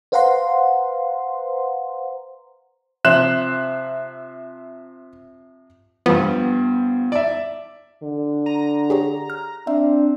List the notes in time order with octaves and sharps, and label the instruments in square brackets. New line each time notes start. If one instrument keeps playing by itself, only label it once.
[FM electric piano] B4 C5 F5 F#5 A#5 C6
[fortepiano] C3 F3 C5 [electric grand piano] E5 F#6 E7
[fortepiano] G2 F3 [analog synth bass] B3
[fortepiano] D5 E5
[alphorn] D3
[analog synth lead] A#5 [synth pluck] D#7
[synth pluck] G4 G#4 C#5
F6
[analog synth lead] C4 [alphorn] D4 [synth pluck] E5